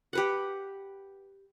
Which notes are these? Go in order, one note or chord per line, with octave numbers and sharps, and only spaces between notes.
G4 B4 F#5